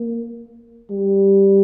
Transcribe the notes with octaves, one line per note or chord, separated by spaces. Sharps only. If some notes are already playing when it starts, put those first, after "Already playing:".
Already playing: A#3
G3